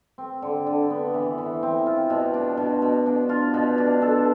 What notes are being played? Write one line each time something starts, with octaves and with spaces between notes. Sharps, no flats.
C4
D3
D3
B3
E3
E3
C4
F4
B2
D4
B2
B2
D4
F4
B2
D4
A4